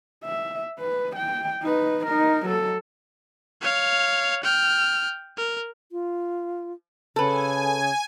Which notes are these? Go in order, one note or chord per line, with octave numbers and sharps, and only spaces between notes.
E5
B4
G5
D#4 B4
D#4 A#4
F#3 A4
C#5 F5
G5 F6
A#4
F4
C#3 A4 B4 G#5